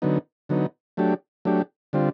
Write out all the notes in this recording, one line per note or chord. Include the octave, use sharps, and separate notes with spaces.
D3 F#3 B3 D#4
D3 F#3 B3 D#4
F#3 A3 D4 G4
F#3 A3 D4 G4
D3 G3 C4 F4